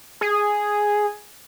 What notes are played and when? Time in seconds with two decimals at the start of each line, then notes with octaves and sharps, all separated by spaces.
0.21 G#4